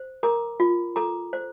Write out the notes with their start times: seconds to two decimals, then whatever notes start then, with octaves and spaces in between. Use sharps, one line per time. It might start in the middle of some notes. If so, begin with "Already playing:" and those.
Already playing: C5
0.23 A#4 A#5 D6
0.60 F4
0.96 A4 A#5 D6
1.33 C5